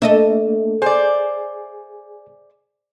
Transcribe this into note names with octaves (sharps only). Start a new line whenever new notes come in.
A3 A#3 D4 A4 D#5 E5
G#4 C5 D5 G#5